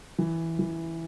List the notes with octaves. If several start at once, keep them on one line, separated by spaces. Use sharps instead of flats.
E3
E3